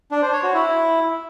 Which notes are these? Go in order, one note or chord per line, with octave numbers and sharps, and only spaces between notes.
D4
C5
C#5
F#4
E4